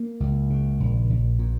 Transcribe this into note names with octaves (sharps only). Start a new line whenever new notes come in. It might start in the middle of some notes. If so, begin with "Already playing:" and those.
Already playing: A#3
C#2
C#3
A#1
A#1
A#2